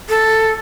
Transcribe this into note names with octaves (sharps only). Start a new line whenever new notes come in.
A4